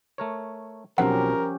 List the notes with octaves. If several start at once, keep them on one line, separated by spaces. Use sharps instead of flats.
A3 A#4 C#5
B1 F3 F#3 C4 C#4 G4 A#4 F#5